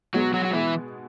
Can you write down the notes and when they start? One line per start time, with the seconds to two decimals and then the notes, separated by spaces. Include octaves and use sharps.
0.14 B2 F#3 G#3 B3 F#4
0.33 F#3 F#4
0.45 F#4
0.53 B2 E3 G#3 E4